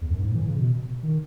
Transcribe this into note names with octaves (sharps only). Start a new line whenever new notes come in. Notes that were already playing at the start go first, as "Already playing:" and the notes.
E2
F#2
G#2
A2
E3
C#3
B2
D#3